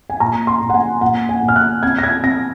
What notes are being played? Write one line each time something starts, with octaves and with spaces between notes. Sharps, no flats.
G#5
A#2 A#5
C6
A#2
F#5
G#5
A#2 F#5
G#5
A#2
F6
F#6
C4 G#6
A#6
G#6
C4 A#6